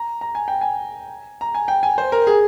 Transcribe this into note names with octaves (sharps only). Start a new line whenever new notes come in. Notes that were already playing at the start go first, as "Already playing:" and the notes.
Already playing: A#5
A#5
G#5
G5
G#5
A#5
G#5
G5
G#5
C5
A#4
G#4